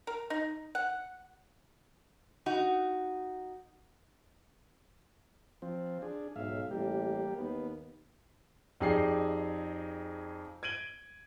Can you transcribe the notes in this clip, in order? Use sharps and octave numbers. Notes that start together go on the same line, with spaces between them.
A#4
D#4
F#5
D#4 F#4
F3 C4
D4 G#4
B1 G#2 E5 F5
A1 G3 A#3 G4
D#2 B3
F2 D#4 G4 G#4 D5 C7
G#6 D7 D#7 F#7 G7